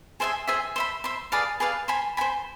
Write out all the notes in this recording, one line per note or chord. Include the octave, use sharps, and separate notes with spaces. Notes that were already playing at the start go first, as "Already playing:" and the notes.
G#4 C5 E5 G#5
G#4 C5 E5 G#5
C5 E5 B5
C5 E5 B5
G#4 B4 D5 F5
G#4 B4 D5 F5
C5 G#5 B5
C5 G#5 B5